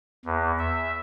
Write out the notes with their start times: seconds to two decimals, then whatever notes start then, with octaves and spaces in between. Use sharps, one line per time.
0.25 E2
0.59 E5